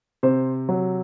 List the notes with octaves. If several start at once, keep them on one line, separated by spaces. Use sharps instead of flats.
C3 C5
F#3